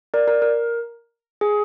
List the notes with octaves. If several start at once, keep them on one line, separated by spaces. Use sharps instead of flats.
A#4 D5
A#4
A#4
G#4